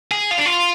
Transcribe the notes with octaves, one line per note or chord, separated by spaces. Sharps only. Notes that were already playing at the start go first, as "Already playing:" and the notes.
G#4
F4
D4
F4